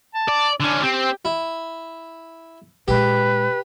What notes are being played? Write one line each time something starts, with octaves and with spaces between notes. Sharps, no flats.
A5
D5
D3 C#4 D4
C4 G4
E4
A#2 G#3 G4 B4